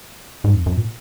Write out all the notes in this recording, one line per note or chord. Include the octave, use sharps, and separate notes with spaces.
G#2
F2
F#2
A#2